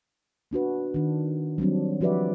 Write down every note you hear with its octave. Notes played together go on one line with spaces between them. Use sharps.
A#3 D4 F#4 B4
D#3 D4
F#3 G3 C4 D4
F3 F#4 G4 B4 D5 E5